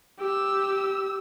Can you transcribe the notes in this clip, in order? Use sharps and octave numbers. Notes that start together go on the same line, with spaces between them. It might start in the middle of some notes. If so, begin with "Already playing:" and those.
G4 E6